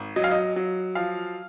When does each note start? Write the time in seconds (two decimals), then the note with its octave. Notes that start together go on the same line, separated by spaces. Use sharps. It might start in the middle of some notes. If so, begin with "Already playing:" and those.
Already playing: G#1
0.16 F#3 D#5
0.24 F5
0.31 D#5
0.56 F#3
0.95 F3 F5